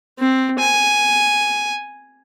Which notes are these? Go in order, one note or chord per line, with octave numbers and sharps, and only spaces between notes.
C4
G#5